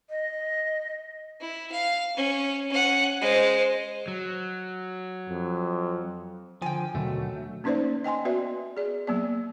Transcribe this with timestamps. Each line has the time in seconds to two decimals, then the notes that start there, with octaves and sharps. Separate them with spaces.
0.10 D#5
1.40 E4
1.72 F5
2.16 C#4
2.70 C#4 F#5
3.20 G#3 C5
4.08 F#3
5.29 F2
6.62 D3 F3 G5 G#5
6.95 D#2 B2 D3 F#3 A3
7.64 A#3 C#4 D#4 B4 C5 D5
8.04 D#5 G5 G#5 C6
8.25 B3 F#4 B4 D5 E5
8.77 G#4 D5
9.07 F#3 A#3 B3 D5